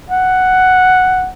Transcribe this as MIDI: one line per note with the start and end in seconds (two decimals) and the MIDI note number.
0.10 1.30 78